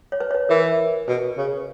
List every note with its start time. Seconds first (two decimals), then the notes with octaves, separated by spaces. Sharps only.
0.12 C#5
0.20 B4
0.31 C#5
0.35 B4
0.49 E3 A#4
1.08 B2 B4
1.37 C#3